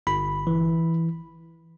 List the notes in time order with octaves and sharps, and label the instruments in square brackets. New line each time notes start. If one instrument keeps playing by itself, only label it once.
[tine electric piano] G1 B5
E3